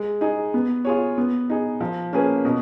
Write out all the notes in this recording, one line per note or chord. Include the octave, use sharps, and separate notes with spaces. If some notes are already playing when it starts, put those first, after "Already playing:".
Already playing: G#3
D#4 G#4
B3
F4 G#4 C#5
B3
D#4 G#4
F3
A#3 C#4 G#4 B4
B2